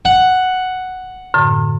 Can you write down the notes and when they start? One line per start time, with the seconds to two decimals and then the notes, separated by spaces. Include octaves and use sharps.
0.05 F#5
1.34 F#2 A2 D3